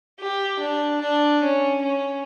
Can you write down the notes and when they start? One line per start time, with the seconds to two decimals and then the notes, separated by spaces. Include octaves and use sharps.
0.20 G4
0.60 D4
1.01 D4
1.42 C#4
1.82 C#4